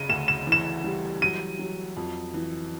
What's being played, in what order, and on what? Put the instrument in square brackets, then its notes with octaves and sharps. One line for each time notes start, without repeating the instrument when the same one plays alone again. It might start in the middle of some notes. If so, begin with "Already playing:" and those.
Already playing: [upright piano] C#3 [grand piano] D#7
[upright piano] D2 [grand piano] E7
[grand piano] E7
[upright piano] E3
[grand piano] E7
[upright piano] G3
[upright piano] F#3 [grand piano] D#7
[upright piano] F#3
F2
E3